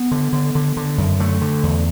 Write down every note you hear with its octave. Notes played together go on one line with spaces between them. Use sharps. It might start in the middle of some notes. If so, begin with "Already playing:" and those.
Already playing: B3
D3
D3
D3
D3
F#2
D3 A3
D3
E2